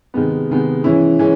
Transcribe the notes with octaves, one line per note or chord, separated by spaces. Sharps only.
C3 D#3 G#3 B3
C3 D#3 G#3 B3
E3 G#3 C#4 E4
E3 G#3 C#4